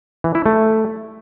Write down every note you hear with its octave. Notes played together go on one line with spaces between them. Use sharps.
E3
E4
A3